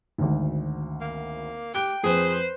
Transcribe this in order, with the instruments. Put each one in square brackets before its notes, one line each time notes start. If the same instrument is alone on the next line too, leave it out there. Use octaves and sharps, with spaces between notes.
[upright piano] G#1 D2
[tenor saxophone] A#3
[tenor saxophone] G4 [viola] G5 [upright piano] F#6 G7
[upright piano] F2 [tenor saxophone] G#4 [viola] B4 C5